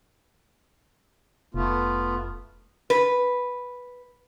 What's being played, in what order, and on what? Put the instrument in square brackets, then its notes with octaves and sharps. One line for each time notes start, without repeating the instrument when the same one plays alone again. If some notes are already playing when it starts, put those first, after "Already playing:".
[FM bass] F1 [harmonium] A3 B3 F4
[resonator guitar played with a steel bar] B4